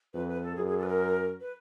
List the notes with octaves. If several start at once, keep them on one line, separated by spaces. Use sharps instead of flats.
F2 B4
B4
A4
F#2 G#4
G#4
A4
B4
A#4
B4